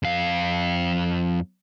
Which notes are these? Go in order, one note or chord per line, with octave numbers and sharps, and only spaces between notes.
F2 F5